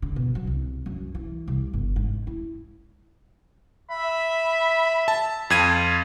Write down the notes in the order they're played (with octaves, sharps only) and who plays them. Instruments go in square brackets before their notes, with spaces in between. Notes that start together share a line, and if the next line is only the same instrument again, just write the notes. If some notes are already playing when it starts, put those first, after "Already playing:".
[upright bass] D3
B2
F#3
C2
F#2
E3
C2
G1
G#2
E4
[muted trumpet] E5 [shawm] B5
[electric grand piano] A5
[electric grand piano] F2 G#6 D#7 [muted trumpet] F4